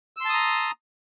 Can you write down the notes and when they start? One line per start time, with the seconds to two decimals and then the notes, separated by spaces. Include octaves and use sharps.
0.17 E6
0.21 C6
0.25 A5
0.29 D#6
0.33 A#5